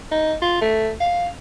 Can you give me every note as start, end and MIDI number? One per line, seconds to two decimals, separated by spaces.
0.11 0.34 63
0.42 0.58 65
0.62 0.90 57
1.00 1.28 77